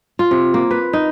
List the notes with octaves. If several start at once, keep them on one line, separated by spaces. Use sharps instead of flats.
F4
C3
A#3
B4
D#4